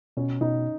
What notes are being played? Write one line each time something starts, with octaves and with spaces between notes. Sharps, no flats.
B2 C#4
B2 D#4